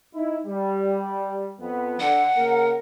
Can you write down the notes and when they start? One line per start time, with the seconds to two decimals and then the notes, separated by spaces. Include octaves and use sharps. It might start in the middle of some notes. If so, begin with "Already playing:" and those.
0.15 D#4 E4
0.46 G3
1.60 F2 B3
2.00 D3 F#5
2.37 C#3 A#3 A#4